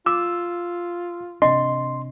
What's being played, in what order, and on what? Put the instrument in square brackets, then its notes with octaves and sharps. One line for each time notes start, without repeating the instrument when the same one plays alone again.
[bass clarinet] F4 [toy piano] D6 [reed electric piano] E6
[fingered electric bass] C3 C4 D4 [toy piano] D#5 [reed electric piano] C6